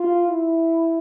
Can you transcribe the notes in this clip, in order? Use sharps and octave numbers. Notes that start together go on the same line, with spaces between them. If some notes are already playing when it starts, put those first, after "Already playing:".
Already playing: F4
E4